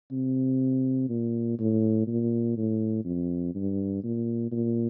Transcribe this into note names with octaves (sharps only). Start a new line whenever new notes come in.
C3
A#2
A2
A#2
A2
F2
G2
A#2
A#2